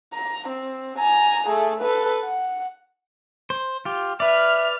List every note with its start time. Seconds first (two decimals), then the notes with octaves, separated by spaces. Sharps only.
0.14 A#5
0.49 C4
0.99 G#5 A#5
1.47 A3 G#4
1.80 A4 B4
2.23 F#5
3.50 C5
3.85 F4 G4
4.20 B4 D5 E5 F6